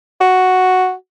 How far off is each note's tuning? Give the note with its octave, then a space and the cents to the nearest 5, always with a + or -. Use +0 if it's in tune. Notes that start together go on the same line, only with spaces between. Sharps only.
F#4 +0